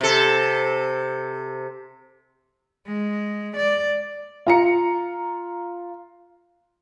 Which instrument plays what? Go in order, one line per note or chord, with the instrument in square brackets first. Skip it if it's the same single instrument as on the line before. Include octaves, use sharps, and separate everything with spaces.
[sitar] C3 A4
[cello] G#3
D5
[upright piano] F4 A#5 C#7